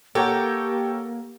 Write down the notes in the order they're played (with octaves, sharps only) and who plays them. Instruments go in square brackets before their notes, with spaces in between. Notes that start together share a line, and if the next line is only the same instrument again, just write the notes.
[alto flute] A#3 [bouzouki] G4 [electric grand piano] A4 G5 A#5 [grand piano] A#4 C#5 F#5